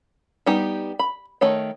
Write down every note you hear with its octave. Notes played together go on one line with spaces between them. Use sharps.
G3 B3 D#4 G4
B5
D#3 A3 D#4 C#5